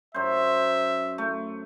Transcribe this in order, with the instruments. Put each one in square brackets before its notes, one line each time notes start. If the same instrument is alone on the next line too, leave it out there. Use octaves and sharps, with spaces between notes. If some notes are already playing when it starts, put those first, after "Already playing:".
[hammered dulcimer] F#2 C5 [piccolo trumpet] E5
[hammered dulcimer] A3